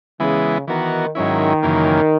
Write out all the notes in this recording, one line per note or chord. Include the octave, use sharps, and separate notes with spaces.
C#3 E3 G#3 B3 E4
D#3 E3 B3 F#4 A#4
G#2 D#3 F#3 C#4 E4
F#2 C#3 E3 A#3